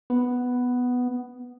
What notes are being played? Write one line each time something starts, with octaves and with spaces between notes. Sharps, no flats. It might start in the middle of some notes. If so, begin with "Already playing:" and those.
B3